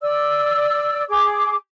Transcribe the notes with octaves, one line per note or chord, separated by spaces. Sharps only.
D5 E6
G#4 D6